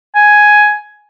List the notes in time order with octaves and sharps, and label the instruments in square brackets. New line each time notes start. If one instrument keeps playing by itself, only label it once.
[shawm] G#5